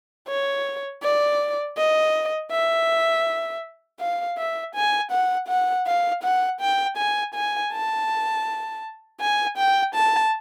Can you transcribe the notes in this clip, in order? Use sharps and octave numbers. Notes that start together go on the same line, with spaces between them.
C#5
D5
D#5
E5
F5
E5
G#5
F#5
F#5
F5
F#5
G5
G#5
G#5
A5
G#5
G5
A5